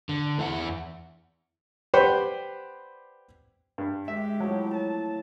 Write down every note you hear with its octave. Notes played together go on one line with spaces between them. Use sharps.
D3
E2 E4 E5 F#5
G4 B4 C5 D5 F#5 G5
G2
G#3 G4 E5
A2 F3 F#3
A5